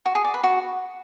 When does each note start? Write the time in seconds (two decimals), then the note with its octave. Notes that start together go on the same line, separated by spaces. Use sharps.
0.06 F#4
0.15 G#4
0.25 D5
0.34 B4
0.43 F#4